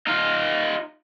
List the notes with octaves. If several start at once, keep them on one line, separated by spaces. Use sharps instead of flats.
D#4 F4